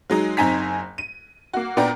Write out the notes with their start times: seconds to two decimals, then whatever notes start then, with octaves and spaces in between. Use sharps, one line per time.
0.10 F#3 G#3 D#4
0.37 F#1 C4 D#4 G#5 A#5 B6
0.98 D#7
1.53 A#3 F#4
1.77 A#2 B3 D4 A#4 G5 A#5